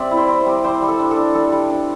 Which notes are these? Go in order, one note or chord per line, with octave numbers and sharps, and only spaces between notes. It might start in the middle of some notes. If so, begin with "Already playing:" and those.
Already playing: G3 C4 D5 E5
E4
C5
C4
C5
G3
G3 C5
G3
A4
D4
A4
D4
G3 A4
G3
D4